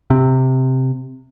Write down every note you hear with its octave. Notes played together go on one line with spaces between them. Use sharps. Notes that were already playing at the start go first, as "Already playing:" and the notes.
C3